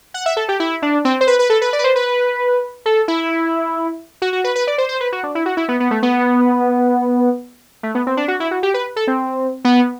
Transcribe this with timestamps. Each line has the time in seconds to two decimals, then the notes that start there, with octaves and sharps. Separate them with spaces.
0.14 F#5
0.26 E5
0.37 A4
0.48 G4
0.60 E4
0.82 D4
1.05 C4
1.21 C5
1.27 B4
1.39 B4
1.50 A4
1.62 B4
1.73 D5
1.79 B4
1.84 C5
1.96 B4
2.86 A4
3.08 E4
4.22 F#4
4.33 F#4
4.44 B4
4.56 B4
4.67 D5
4.78 C5
4.89 C5
5.00 B4
5.12 F#4
5.23 D4
5.35 E4
5.46 F#4
5.57 E4
5.68 B3
5.80 B3
5.91 A3
6.03 B3
7.83 A3
7.95 B3
8.07 C4
8.17 D4
8.28 F#4
8.40 E4
8.51 F#4
8.63 G4
8.74 B4
8.96 A4
9.07 C4
9.65 B3